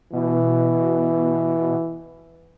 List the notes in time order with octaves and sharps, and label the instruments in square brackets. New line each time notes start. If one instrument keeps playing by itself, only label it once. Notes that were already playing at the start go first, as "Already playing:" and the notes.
[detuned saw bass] B2 [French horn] E3